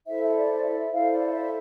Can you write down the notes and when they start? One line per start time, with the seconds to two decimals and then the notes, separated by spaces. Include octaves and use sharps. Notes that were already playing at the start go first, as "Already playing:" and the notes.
0.07 E4 A4 C5 E5
0.24 E5
0.35 D5
0.63 E5
0.91 E4 A4 C5 F5
1.12 D5
1.33 E5